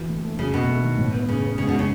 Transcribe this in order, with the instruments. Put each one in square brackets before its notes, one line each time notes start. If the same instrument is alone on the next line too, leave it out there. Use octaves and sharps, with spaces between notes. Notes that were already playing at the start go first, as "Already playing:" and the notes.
Already playing: [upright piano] E3 F#4
A3
A3
[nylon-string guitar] C#3 [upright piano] F#3
[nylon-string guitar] B2 [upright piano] A3
[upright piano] A3
D#3
A2
B3
[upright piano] A2 [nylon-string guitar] C#3
[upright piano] B3
[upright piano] G#2 [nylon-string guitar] C#3
[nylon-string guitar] B2
[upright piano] G#3
[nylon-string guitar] C#3